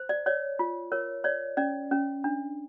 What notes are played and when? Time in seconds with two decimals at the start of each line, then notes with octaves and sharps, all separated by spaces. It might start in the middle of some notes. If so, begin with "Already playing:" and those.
Already playing: C5
0.09 D5
0.26 C#5 D5
0.59 F4
0.92 A#4 C#5
1.24 C#5 D5
1.57 C#4 D5
1.91 C#4
2.24 D4